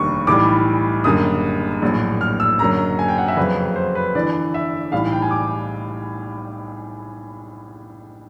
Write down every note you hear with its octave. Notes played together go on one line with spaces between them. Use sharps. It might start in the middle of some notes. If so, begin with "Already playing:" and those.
Already playing: F1 D#2 D3 G3 C#6
B1 A2 E3 G3 D6
F#1 F#2 D3 G3 D#6
A#1 A2 F#3
F6
E6
F#1 F#2 D3 F#3 A#5
G#5
G5
F#5
E5
F2 C#3 F#3 B4
C5
B4
G1 G2 E3 D5
E5
B1 A2 E3 G3 F5
G5
G#5
D6